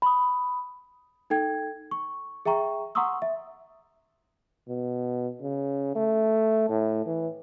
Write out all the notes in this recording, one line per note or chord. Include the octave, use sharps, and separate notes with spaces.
B5 D#6
D#4 A4 G5 G#6
C#6
G#4 E5 G5 A#5 C#6
F#5 A#5 C6 C#6 D#6 E6
E5
B2
C#3
A3
A2
E3